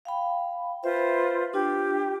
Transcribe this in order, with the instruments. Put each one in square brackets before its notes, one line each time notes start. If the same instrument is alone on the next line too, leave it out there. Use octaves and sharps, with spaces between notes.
[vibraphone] F5 G5 B5
[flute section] F4 B4 C5 [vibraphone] E5
[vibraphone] D4 F4 [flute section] G4